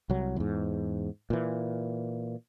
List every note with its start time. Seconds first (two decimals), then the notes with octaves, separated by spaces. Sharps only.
0.10 C2 F#3
0.36 E2 G#2
1.30 A#2 E3